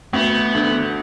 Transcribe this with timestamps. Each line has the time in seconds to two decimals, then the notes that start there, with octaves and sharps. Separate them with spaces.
0.13 D2 B3
0.55 D3